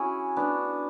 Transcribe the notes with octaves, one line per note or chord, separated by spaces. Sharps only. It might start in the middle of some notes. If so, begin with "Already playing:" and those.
Already playing: C#4 E4 F#4 G#4
B3 D4